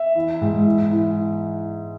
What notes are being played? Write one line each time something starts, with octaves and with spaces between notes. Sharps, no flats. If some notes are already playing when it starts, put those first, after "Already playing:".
Already playing: E5
E3
G#2
E3
E3